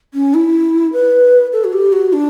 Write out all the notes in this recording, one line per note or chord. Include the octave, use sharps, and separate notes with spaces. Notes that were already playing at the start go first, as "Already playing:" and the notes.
C#4
E4
B4
A4
F#4
G4
F#4
D4